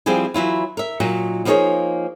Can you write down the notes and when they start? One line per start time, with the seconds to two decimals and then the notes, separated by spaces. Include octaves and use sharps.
0.06 F3 G3 C4 E4 G#4 G#5
0.34 E3 F#3 E4 F4
0.77 A#4 E5
1.00 A#2 F#3 D#4
1.45 F3 A#3 B3 D#4 G#4 C#5